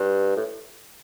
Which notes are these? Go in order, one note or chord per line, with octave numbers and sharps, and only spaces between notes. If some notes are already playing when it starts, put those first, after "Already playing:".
Already playing: G2
A2